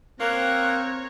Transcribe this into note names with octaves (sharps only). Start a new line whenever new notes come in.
A#3 C4 C#5 A#5 F#6